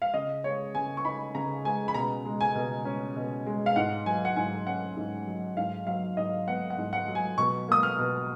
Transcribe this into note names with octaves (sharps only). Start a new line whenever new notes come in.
F5
C#3 D#5
G#3 C#5
C#3 G#5
C#6
D#4 B5
C#3 A#5
G#3 G#5
B5
B2 A#5
G#3
G#5
B2
C#4
B2
G#3
F5
G#2 F#5
F#3 G#5
F#5
G#2 G#5
C#4 F#5
G#2
F#3
G#2 F5
F#3 F5
G#2 D#5
B3 F#5
F#5
G#2
F#5
F#3
G#5
B2 C#6
A#3 D#6
F6
B2